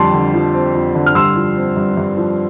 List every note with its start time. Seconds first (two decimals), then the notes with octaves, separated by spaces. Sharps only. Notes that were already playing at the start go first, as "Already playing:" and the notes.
Already playing: F2 D3 G3 A5 C6
0.14 D3
0.34 F3
0.54 C4
0.75 F2
0.95 D3
1.06 F6
1.15 G2 C6 E6
1.36 F3
1.57 C4
1.77 G2
1.97 G2
2.17 F3